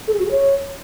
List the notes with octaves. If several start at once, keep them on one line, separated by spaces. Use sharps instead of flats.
A4
G#4
F#4
G#4
C#5